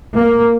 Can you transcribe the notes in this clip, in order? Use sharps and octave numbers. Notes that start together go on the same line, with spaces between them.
A#3